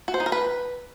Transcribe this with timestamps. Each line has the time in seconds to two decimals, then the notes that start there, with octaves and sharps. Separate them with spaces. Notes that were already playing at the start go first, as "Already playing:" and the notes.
0.08 F#4
0.14 C5
0.20 D#4
0.26 A#4
0.32 B4